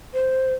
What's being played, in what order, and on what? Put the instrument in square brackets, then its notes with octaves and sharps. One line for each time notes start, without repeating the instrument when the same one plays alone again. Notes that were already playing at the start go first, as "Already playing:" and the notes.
[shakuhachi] C5